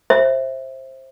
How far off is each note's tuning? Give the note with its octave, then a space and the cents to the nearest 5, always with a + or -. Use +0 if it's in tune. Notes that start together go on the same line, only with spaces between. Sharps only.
C5 +20 E5 +0